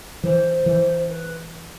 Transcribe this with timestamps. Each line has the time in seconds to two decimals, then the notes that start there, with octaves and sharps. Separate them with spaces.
0.23 E3 C5
0.66 E3
1.08 B4